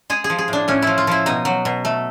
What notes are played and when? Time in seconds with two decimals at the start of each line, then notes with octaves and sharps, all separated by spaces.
0.10 G#3 G#4
0.24 G#4
0.30 F3
0.39 G#4
0.48 A2 D4
0.68 A2 C#4
0.82 F3 E4
0.98 F4
1.07 F3 E4
1.26 B2 D#4
1.45 F#3
1.65 B2
1.85 A3